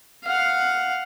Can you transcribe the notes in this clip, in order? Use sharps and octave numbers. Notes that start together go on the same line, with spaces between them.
F5 F#5